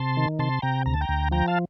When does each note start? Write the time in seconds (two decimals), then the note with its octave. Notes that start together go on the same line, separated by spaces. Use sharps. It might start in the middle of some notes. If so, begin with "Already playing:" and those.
Already playing: C3 A5 C6
0.17 D#3
0.39 C3 A5 C6
0.62 C3 G5 A#5
0.86 D2 A#5
0.94 A5
1.01 G5 A#5
1.09 D2
1.31 F3 G5 A#5
1.48 F5 A5